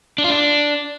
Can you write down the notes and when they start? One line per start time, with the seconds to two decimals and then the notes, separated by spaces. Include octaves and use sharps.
0.18 D4
0.24 F4
0.30 D4